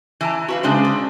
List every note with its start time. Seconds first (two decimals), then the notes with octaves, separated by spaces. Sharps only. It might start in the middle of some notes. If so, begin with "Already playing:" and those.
0.21 E3 A5 A#5
0.48 F#4 B4 F5
0.63 C#3 G#3 D4 C5
0.85 D3